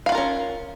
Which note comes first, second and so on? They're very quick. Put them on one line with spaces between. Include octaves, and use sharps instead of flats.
F5 F#4 F4 A#4 C#4